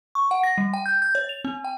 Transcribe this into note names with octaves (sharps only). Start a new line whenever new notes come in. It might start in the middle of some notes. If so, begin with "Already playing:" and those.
C#6
F#5
A#6
G3
G5
G6
G6
C#5
F7
C4
G5